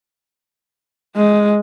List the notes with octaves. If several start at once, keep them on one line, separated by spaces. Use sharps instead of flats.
G#3